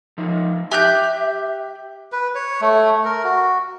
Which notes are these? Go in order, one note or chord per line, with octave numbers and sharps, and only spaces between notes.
F3 D#4
G4 E5 F#6 G6
B4
C#5
A3
A#4
F#4